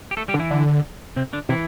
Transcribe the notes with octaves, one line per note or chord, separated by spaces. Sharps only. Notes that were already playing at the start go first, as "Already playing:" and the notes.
G4
A3 A4
G3 G4
D3
E3 E4
D3
C3 C4
D3 D4
C3 E3 E4